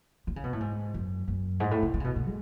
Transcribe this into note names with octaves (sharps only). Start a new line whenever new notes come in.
D3
C#3
B2
A2
G#2
F#2
F#2
G#2
A2
C#3
D3
C#3
B2
B2
G#3